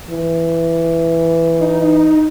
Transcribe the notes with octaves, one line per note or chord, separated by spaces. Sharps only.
E3
D#4